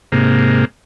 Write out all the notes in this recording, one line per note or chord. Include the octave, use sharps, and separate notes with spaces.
G#2 C3 A#3